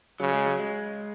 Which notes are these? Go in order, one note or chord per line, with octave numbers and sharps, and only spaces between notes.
C#3 F#3
G#3
F#3
G#3